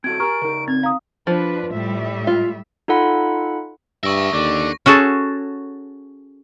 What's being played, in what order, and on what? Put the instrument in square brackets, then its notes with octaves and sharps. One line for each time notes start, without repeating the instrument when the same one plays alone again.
[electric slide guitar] C4 F#4 A4 [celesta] G#6 [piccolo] D7
[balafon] G4 [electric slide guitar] A#4 G#5 [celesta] A#5 C#6 F6
[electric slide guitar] C#3 D#4 [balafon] A#4
[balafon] C4 [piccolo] G#6
[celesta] F5 D#6 [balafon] A#5
[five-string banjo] F3 [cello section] D4 B4
[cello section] A2 G3 E5
[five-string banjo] F4
[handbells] D#4 F4 A4 F#5 B5
[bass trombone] G2 [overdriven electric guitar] D5 E5 [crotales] C#6 A#6
[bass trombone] D#2 [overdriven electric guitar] D3 [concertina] D5
[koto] C#4 F#4 G#4 A4